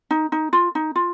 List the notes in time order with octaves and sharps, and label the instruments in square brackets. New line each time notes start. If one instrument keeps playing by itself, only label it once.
[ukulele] D#4
D#4
F4
D#4
F4